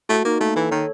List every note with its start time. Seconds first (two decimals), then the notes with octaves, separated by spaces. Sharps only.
0.09 A3 F#4
0.25 A#3 D#4
0.40 A3 A#3
0.56 E3 A4
0.71 D#3 C#5